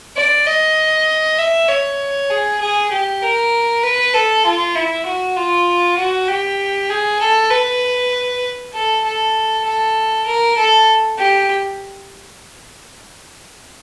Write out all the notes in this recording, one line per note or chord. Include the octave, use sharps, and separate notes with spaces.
D5
D#5
E5
C#5
G#4
G#4
G4
A#4
B4
A4
F4
E4
F#4
F4
F#4
G4
G#4
A4
B4
A4
A4
A4
A#4
A4
G4